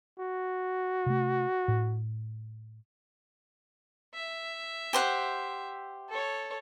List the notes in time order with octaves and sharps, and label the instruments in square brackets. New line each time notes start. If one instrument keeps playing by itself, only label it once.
[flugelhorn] F#4
[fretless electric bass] C3 A3
A2
[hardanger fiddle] E5
[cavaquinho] G4 C5 F#5
[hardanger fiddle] A4 C#5